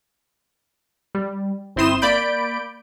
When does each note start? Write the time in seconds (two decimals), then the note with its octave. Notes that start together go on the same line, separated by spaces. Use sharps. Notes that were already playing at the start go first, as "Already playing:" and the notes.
1.15 G3
1.76 G1 C4 E4 C6 D#6 E7
2.02 A#3 D5 B5 G6 D7